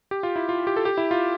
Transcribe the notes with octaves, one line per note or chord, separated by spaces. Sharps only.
G4
F4
E4
F4
G4
A4
G4
E4
F4